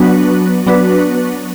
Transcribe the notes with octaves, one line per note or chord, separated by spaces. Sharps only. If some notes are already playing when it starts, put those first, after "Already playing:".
Already playing: F#3 B3 D4 F#4 B4
F#3 B3 D4 F#4 B4